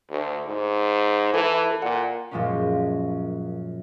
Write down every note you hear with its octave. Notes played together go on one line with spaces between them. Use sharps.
D2
G#2
E3 A4
A#2 F#5
F#2 A#2 F3 G#3 A#3 C#4